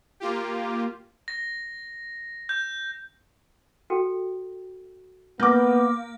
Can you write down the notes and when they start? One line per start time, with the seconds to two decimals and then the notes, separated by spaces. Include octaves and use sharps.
0.20 A#3 F4 G4
1.28 A#6
2.49 G6
3.90 F#4 A4 G5
5.40 A#3 B3 D6 G6